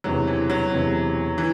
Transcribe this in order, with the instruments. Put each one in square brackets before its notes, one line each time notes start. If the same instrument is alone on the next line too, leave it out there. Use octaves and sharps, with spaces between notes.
[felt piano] E1 E2 C3 [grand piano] F#3
[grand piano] E3
F#3
[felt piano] E1 E2 C3
[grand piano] E3